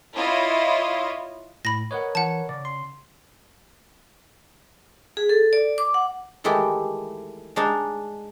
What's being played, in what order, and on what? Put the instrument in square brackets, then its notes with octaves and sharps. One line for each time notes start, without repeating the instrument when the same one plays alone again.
[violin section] E4 F4 C#5 D#5
[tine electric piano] A2 [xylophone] B5 A#6
[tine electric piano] A#4 B4 C#5 [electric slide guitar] D#5 F#5
[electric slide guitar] E3 [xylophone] F#5 A5
[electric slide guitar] C#3 [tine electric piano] D5
[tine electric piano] C6
[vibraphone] G#4
A4
D5
D6
F#5
[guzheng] D#3 E3 G#3 A3 E4 G4
G#3 D4 D#4